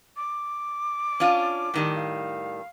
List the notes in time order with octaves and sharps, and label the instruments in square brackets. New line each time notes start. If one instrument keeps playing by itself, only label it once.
[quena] D6
[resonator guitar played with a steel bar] C#4 D4 F4
A2 D#3 G3
[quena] F5